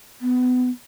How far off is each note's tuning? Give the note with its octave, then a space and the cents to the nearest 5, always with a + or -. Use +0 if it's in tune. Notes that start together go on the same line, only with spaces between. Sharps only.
B3 +25